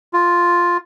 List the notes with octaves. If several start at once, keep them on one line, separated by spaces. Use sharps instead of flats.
F4